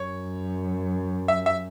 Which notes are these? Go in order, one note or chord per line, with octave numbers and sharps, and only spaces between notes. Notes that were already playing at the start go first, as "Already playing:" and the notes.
Already playing: F#2 C#5
E5
E5